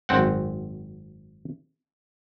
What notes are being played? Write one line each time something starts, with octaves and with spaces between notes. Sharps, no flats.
G#1 F#2 C4 F#5